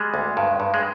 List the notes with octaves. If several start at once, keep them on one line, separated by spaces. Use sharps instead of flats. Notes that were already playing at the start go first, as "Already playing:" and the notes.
Already playing: G3 G#3
D2
G2
G2
G#3